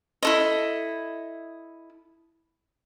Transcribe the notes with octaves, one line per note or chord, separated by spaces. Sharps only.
E4 A4 D#5